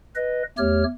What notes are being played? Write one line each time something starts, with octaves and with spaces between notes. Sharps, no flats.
B4 D#5
E2 A3 G4 C#5 F6